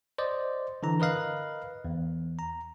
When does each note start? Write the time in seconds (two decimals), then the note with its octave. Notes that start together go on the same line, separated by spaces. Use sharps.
0.18 C5 D5 D#5
0.83 D3 E3 A#5
1.00 A#4 B4 D#5 F5 F#6
1.85 E2
2.39 A#5